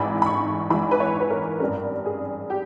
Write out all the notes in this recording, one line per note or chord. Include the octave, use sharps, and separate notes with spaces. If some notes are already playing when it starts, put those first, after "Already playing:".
Already playing: G#1 G#2 E3 B5
B5
C#6
G#1 G#2 E3 B5
B4
C#5
B4
A#4
G#1 G2 G3 C#4 A#4
G#4
G4